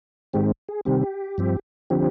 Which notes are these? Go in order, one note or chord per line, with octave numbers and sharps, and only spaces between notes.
G#2 D#3 G#3 C4 G4
G#4
C3 D#3 G3 C4 G4
G2 F3 C4
D3 F3 C4 G4